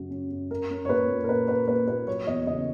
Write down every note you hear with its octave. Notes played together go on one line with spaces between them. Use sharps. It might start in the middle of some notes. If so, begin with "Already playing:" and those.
Already playing: F#2 C#3 F#3 C#4
C#4
F#2
C#4 A#4
C#4
C#5
A#2 B4
A#2
A#4
A#2 B4
A#3 B4
A#2 B4
A#2 B4
F#3 C#5
E2 D#5
C#3 D#5